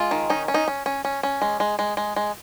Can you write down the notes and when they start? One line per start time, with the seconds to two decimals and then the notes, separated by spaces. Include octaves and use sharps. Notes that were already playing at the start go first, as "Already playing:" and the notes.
Already playing: G#3 F4
0.11 D#3
0.30 C#4 D#4
0.48 C#4
0.54 D#4
0.68 C#4
0.86 C#4
1.05 C#4
1.23 C#4
1.42 G#3
1.60 G#3
1.79 G#3
1.97 G#3
2.16 G#3